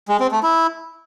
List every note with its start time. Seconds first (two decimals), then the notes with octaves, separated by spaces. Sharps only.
0.08 G#3
0.20 C4
0.32 A3
0.43 E4